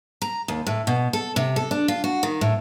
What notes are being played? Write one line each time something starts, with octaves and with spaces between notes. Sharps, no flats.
A#5
D#2
A2
B2
A4
C3
A4
D4
F4
F#4
D#3
A2